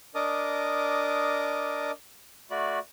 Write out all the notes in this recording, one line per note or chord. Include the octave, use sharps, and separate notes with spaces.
D4 A#4 D#5 A5 D6 D#6
A3 F#4 D5 B5